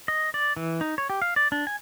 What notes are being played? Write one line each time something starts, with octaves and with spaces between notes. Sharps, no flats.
D#5
D5
E3
D#4
C#5
G4
F5
D5
D4
G#5